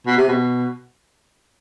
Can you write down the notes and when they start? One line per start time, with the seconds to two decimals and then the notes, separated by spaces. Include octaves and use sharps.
0.06 B2
0.17 C3
0.28 B2